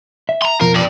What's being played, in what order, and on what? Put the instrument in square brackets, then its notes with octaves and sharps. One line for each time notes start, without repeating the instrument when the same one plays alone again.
[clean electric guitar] E5
[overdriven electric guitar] A#5 C6
[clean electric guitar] F2 B2 F3 [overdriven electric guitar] A#4
[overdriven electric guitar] G2 D5